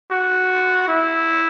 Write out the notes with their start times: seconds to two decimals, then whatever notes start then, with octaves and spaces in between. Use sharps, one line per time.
0.11 F#4
0.88 E4